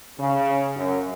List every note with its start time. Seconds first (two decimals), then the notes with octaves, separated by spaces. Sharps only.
0.19 C#3
0.76 F#2